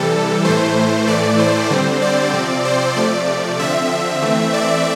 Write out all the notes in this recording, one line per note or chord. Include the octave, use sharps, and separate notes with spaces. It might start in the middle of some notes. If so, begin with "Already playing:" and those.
Already playing: C3 E3 G3 A4
A2 E3 A3 C5
A2 E3 A3 D5
C5
D3 G3 C4
D5
C3 F3 C4
C5
C3 F3 A3 D5
D3 F3 C4 E5
E3 A3 C4
D5